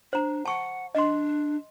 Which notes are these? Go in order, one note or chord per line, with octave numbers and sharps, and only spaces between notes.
D4 C5 A#5
F#5 A5 C#6
D4 D#5 C6